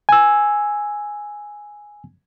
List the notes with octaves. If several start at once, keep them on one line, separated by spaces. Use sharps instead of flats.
G#5 E6